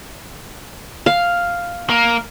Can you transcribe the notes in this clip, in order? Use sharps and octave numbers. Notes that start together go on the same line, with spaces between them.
F5
A#3